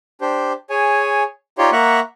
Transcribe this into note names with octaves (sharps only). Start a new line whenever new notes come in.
D4 G4 C5
G#4 C#5 G#5
D#4 F4 G4 C#5 D5 C6
A#3 E5 F#5 A#5 C#6 F#6